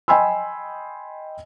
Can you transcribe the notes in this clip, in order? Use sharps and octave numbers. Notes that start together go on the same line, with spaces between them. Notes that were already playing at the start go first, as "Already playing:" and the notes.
D#5 G5 G#5 B5 C6 E6